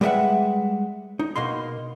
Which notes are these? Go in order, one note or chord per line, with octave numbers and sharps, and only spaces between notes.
G3 G#3 A#4 B4 E5 F#5
D#4
B2 A#3 D#4 C6